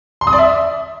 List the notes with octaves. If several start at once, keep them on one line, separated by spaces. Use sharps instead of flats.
C6
D#6
D5
E5